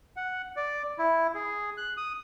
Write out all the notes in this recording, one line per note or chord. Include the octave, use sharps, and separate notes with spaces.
F#5
D5
E4
G#4
F#6
D#6